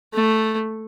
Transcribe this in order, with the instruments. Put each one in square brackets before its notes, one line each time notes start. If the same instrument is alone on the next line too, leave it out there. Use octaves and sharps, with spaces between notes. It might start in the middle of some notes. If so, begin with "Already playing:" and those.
[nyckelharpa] A3